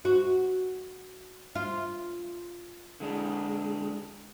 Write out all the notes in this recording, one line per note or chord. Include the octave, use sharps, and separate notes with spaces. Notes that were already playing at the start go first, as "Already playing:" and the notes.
F#4
F4
D3 G#3 D4